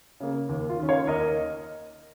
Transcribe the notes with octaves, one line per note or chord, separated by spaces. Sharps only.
C#3 A#3
D#2
F4
D#3 C#4
C#5 F5
D#2 A#4 D#5